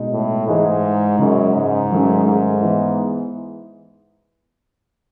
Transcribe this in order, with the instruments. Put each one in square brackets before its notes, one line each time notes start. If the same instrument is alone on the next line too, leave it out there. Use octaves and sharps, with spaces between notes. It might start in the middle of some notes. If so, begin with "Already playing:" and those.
Already playing: [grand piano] B2 G#3 D#4
[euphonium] A2
[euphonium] G#2 [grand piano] E3 G#3 D#4 G#4
[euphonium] F#2 [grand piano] C#3 G#3 D#4
[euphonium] G#2
[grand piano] D#3 F#3 A3 C#4
[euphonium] G#2
[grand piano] E3 G#3 B3